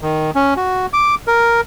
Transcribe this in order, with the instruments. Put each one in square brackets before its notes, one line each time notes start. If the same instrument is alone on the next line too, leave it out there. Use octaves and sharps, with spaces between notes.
[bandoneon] D#3
C#4
F#4
D6
A#4